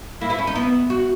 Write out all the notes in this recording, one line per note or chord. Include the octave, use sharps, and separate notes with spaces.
A#3 E4
B3
C#4
D#4
B3 E4
F#4